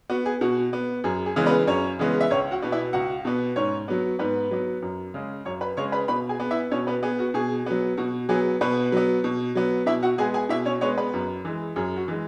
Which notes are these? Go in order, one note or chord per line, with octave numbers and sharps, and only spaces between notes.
B3 F#4
G#4
B2 F#4
B3
F#2 G#4
G#4
C#3 E3 G#3 B3
B3 B4
F#2 C#4 C#5
C#3 E3 G#3 B3
E5
C#2 C#4 C#5
F#4 F#5
B2 B3
E4 E5
C#2 F#4 F#5
B2 B3
G#2 C#4 C#5
F#3 B3
G#2 B3 B4
F#3 B3
F#2
C#3 G#3
F#2 C#5 C#6
B4 B5
C#3 G#3 C#5 C#6
B4 B5
B2 B4 B5
G#4 G#5
B3
E4 E5
B2 C#4 C#5
B3 B4
B3 G#4
F#4
B2 G#4
F#3 B3
B2 F#4
F#3 B3 G#4
B2 B3 B4
F#3 B3
B2
F#3 B3
B2 E4 E5
F#4 F#5
G#3 B3 G#4 G#5
G#4 G#5
B2 E4 E5
C#4 C#5
G#3 B3 C#4 C#5
B3 B4
F#2
E3 G#3
F#2 G#4
F#4
E3 G#3